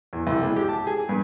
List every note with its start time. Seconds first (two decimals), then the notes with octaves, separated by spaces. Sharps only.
0.13 E2
0.27 C2
0.43 G#3
0.56 G4
0.69 A5
0.87 G#4
1.09 G2